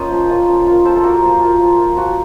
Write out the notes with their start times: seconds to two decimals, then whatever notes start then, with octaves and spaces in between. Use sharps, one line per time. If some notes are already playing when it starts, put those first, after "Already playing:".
Already playing: A#3 C#4 F4 C5 D#5
0.10 F3
0.29 A#3 C#4 F4
0.48 F3
0.66 A#3 F4
0.85 F3 A4 C5
0.96 A4
1.03 A#3 F4 F#4 A#4
1.22 F3
1.41 A#3 F4
1.60 F3
1.78 A#3 F4
1.96 F3 F#4